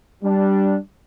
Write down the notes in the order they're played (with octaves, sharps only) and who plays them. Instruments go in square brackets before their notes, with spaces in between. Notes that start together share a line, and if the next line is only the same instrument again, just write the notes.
[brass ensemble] G3 D4